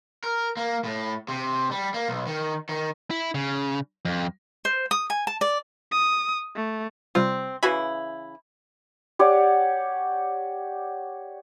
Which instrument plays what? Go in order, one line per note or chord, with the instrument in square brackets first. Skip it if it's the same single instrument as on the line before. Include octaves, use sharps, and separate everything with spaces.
[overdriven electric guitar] A#4
A#3
A2
C3
G3
A#3
B1
D#3
D#3
[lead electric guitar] E4
C#3
F2
[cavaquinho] C5
D#6
G#5
A5
D5
[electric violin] D#6
A3
[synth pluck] C3 G3 F4 [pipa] C4
[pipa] C#3 E3 E4 [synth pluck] F#4 G#5 B5
[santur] G4 C#5 D5 F#5